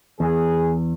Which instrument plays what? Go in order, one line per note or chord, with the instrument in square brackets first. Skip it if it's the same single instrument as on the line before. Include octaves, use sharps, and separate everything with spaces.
[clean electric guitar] E2 [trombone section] G#4